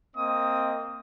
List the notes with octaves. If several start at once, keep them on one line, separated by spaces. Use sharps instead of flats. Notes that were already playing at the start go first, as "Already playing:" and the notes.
A#3 C4 D#5 D#6